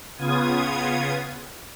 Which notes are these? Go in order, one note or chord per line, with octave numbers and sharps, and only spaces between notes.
C#3 B3 F4 D#6 G#6